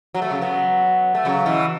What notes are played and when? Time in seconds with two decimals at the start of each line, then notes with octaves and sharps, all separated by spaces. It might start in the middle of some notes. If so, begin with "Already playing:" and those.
0.14 F#3
0.22 A3
0.30 C#3 F#3
0.41 F#3 B3
1.15 A3
1.25 C#3 F#3
1.46 B2 E3